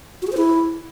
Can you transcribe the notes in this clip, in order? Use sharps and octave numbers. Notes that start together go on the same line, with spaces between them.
F#4
G#4
C5
E4